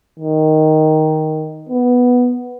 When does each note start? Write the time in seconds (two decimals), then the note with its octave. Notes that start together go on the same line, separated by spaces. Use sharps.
0.20 D#3
1.69 B3